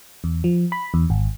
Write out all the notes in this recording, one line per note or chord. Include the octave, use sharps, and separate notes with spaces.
E2
F3
B5
E2
G#1